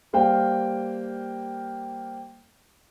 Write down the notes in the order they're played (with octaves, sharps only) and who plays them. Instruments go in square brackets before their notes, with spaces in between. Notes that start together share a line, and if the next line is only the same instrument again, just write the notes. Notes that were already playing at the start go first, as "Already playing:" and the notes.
[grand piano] G3 A#3 C5 F5 G5